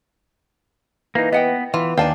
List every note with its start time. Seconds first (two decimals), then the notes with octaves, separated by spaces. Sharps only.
1.15 E3 A#3 D#4
1.32 B3 D#5 F#5 G5
1.74 E3 B3 F4
1.98 D#2 D4 F5 G5 G#5